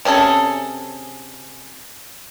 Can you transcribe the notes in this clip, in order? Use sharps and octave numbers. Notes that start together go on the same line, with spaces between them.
C3 C#4 G#4 A4